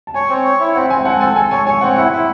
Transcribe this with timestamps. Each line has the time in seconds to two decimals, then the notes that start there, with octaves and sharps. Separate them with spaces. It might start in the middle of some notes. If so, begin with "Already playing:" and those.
0.07 A5
0.14 C#5 G#5
0.29 C4
0.45 C#5
0.60 E4
0.75 C4 F#5
0.90 C4 G#5
1.05 C4 F#5 A5
1.21 A4 G#5
1.36 A4 G#5
1.51 C#5 G#5
1.67 C#5 G#5
1.81 C4 F#5
1.96 E4 F#5
2.12 E4